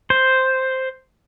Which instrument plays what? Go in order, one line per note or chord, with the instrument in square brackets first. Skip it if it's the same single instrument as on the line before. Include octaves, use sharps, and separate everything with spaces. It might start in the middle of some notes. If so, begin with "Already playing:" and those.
[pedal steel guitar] C5